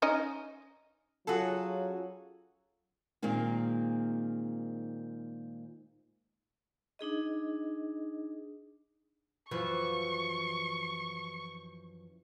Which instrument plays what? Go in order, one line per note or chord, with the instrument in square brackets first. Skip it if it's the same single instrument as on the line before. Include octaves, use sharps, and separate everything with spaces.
[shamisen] C#4 D#4 D#5
[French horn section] F#3 C#4 F4 [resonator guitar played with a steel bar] F#4 G#4 A4
[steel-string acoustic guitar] A#2 D#3 G#3 A#3 C4
[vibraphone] D4 D#4 G#4 D#5
[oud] F#2 E3 F3 [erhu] C#6